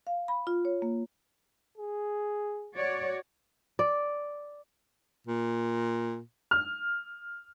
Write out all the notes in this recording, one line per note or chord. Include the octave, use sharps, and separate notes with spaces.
F5
B5
F4
C#5
A#3
G#4
F#4 C#5 D5
D5
A#2
F6